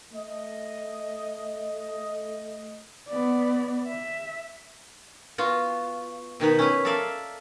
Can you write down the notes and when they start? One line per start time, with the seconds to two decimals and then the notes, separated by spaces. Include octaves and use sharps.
0.14 A3 D#5
3.10 B3 D5
3.87 E5
5.38 B3 F4 F#4
6.40 B2 D#3 D#4 B4
6.59 C#4 E4 B4
6.85 A4 A#4 D5 E5 F5